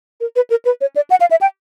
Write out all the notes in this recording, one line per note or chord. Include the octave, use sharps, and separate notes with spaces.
A#4
B4
A#4
B4
C#5
D5
F#5
F5
E5
G5